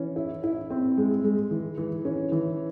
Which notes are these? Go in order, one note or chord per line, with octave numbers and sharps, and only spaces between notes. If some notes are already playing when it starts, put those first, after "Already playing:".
Already playing: E3 C#4
E4
E4
C4
G#3
G#3
E3
E3
C#4
E3